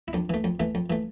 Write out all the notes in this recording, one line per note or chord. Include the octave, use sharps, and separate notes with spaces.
E4
F2 D4
E3 A3
F2
E3 A3
F2
E3 A3